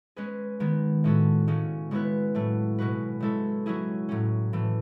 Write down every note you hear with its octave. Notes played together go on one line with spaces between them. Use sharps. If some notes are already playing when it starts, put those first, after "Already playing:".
G#3 C#4 G#4 B4
D#3 G#3 B3
A2 G#3 C#4 F#4 A4
C#3 G#3 C#4
C#3 G#3 B3 E4 B4
A2 F#3 A3
B2 G#3 C#4 F#4 B4
C#3 G#3 C#4 E4 A4
F#3 C#4 E4 G#4
A2 F#3 C#4
A2 E3 A3